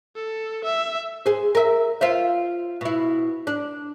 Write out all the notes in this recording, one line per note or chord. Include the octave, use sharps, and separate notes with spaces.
A4
E5
G#4 C5
A#4 E5
F4 C5 E5
B2 E4
D4